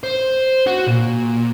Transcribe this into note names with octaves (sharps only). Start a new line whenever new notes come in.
C5
F#4
A#2